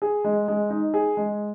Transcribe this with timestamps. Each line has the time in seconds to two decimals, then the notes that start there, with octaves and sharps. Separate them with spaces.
0.02 G#4
0.24 G#3
0.48 G#3
0.70 D#4
0.94 G#4
1.17 G#3